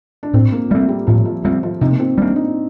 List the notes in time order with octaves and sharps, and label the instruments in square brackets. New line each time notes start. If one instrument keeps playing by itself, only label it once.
[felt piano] D4
[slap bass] A2 [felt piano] C4
[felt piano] A#3
[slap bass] G3 C4 [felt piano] A3
[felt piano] G3
[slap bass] A2 [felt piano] F3
[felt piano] F3
[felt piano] F3 [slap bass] G3 C4
[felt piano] F3
[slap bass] C3 [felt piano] D#4
[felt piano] A#3
C4
[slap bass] G3 [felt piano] D4
[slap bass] A#3
[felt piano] D#4